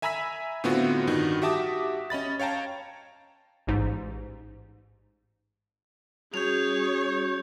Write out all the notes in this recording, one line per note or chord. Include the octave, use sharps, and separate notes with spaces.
E5 G#5 A#5 B5 E6 B6
A2 D3 B3 C4 F4 F#4
G2 D#3 D#4 F#4
F#4 G4 E5 A5 D6 D#6
C#4 D#5 B5 A6
C#5 F5 G5 A5 A#5
A1 G#2
G3 C#4 F#4 G#4 C#5 G6 F7